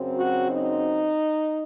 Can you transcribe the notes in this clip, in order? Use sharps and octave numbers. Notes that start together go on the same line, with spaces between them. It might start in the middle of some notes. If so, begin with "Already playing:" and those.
Already playing: F#2 C#3 F#3 C4
F#4
D#4